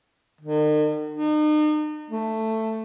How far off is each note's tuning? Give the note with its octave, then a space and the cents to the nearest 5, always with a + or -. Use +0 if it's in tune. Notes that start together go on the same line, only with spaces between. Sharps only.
D#3 -45
D#4 -40
A3 +10